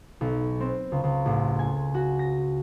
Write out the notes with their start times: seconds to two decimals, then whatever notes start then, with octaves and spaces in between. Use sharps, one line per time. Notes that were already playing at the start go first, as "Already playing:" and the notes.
0.21 B1
0.60 C4
0.92 C#2
1.04 C#2
1.26 A1
1.59 G#5
1.95 F#4
2.19 A#6